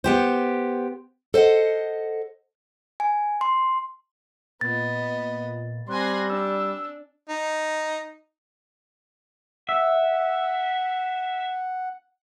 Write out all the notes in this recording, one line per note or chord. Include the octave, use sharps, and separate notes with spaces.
B3 G4 C5
A4 C5 D#5 F#5
G#5
C6
A#2 B3 D#5 A6
G3 C4 G#5 C6 F#6 A#6
D4 E6
D#4
E5 F#5